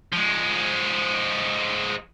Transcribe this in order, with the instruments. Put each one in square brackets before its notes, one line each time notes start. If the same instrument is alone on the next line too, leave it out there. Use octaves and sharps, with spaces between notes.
[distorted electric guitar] F3 G#3